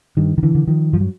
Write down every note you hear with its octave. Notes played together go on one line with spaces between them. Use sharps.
G2 D#3
D#3
D3 E3
D3
D#3 F3
G2 F3
F#3